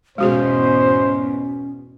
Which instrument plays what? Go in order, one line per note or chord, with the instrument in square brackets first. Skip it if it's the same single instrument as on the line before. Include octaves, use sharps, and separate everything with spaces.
[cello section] E2 G#2 B2 [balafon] G#3 F#4 G#4 [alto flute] C#4 [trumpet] C5